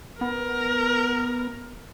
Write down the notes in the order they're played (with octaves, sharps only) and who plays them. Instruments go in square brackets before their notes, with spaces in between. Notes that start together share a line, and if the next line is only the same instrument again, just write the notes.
[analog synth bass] B3 [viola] A#4